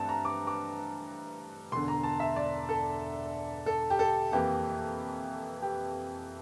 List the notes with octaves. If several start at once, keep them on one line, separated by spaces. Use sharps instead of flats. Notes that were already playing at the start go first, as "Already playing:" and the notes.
Already playing: G2 E3 A3 C4 A5
A#5
D6
D6
E1 E2 D3 C6
A#5
A5
E5
D5
A4
A4
G4
A4
F2 E3 A#3 G4
G4